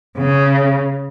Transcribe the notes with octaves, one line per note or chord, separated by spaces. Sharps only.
C#3